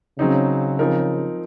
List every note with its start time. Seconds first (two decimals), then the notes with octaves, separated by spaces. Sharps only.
0.19 C#3 F#3 C4 D#4
0.79 F3 C4 D#4 A#4